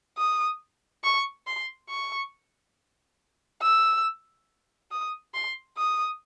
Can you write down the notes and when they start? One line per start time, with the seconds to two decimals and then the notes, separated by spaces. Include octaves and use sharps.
0.18 D#6
1.04 C#6
1.47 C6
1.90 C#6
3.62 E6
4.92 D#6
5.34 C6
5.77 D#6